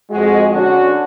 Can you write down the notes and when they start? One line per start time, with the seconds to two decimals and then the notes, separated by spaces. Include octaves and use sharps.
0.11 F2 G#3 F#4
0.51 D3 C#4 D4 F#4